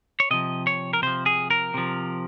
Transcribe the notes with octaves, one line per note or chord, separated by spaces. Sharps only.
C#5
C3 F3 D#5
C#5
A#4
C3 F3 C5
G#4
A#4
C3 F3